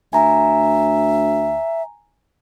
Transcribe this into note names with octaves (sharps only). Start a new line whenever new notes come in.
D2 E5 G#5 A#5